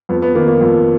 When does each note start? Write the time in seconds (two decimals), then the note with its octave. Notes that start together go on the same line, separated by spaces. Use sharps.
0.09 F2 B3
0.22 B3
0.35 D#3 A#3
0.48 A#3
0.61 F2